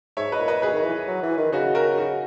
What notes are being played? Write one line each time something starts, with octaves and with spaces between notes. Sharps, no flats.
G#2 C#5 E5
B4 D#5
A#2
B4 D#5
B2 G#4 B4
D#3
E3
F#3
E3
D#3
C#3 D#4 F#4
F#4 A#4
D#4 F#4